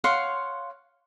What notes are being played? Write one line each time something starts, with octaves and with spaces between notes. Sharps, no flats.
C#5 F5 F#5 C6